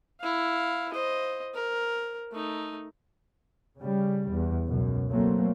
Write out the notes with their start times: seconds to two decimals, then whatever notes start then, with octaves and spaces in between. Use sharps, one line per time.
0.20 E4 F5
0.92 C5 D#5
1.55 A#4
2.32 A3 D#4
3.79 C#3 G3
4.31 E2
4.68 C#2 F#2 B2
5.09 F#3 A3 A#3 C4